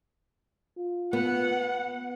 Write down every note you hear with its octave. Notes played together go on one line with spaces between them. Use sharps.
F4
B3 F#5